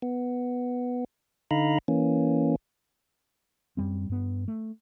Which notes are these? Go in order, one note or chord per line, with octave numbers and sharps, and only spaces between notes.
B3
D3 D#4 F5 A#5 B5
E3 A#3 C#4
F#2 G3 C4
G2 B3
A3